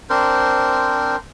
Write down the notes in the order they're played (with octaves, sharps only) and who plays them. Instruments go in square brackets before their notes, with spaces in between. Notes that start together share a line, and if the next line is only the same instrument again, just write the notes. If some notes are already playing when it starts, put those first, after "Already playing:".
[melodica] C4 D4 A#4 C5